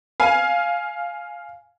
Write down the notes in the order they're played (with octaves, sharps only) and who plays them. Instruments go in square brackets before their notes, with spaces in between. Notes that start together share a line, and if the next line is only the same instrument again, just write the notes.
[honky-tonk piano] F5 G#5